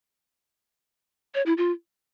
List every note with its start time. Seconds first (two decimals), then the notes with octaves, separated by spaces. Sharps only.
1.35 C#5
1.46 E4
1.57 F4